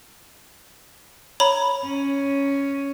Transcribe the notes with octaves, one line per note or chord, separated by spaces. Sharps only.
C#5 A#5 B5
C#4